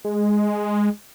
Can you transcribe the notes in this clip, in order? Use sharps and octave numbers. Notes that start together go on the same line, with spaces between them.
G#3